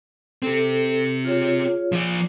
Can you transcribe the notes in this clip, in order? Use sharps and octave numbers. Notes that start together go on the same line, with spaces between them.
C4 G4 A4
F4 G#4 C#5
F3 D5